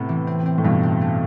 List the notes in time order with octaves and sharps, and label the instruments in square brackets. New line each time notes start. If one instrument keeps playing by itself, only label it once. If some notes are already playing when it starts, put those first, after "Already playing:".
Already playing: [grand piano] A2 C3 [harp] B3
[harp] E3
C4
C4
[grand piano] A2
[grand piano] G2 B2 [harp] A3
[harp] C4
A3